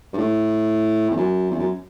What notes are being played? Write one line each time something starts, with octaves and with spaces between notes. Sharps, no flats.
G2
A2
E2
F#2
E2
F#2